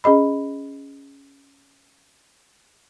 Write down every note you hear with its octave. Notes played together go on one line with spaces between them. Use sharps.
C#4 G#4 D#5 B5